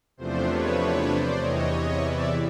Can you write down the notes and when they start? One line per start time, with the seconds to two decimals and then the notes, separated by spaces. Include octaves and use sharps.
0.17 E2 C3 F3 A3 D4 C5
0.47 B4 C#5
1.08 C5 D5
1.39 E2 C3 E3 C#5 D#5
2.01 D5 E5